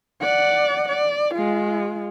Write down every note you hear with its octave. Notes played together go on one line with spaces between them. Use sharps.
D5 F#5
D5
G#3 F4